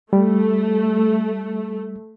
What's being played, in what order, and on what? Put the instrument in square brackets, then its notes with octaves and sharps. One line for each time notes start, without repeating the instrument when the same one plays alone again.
[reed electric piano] G3 [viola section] A3